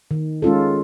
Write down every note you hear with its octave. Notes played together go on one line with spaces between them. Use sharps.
D#3
G#3 C#4 F4 A4